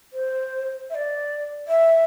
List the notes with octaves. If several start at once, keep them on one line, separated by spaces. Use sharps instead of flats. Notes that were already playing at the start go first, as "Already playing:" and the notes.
C5
E5
D5
E5